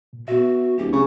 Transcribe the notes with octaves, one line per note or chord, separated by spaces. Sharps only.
A#2
B3 F#4 E5
D1 G4
C#3 D4 C#6